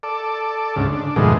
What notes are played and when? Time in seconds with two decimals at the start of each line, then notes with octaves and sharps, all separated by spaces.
0.03 A4 D5
0.76 D2 G#2 C#3
0.93 D4
1.16 F2 G#2 B2 D#3 G#3 A3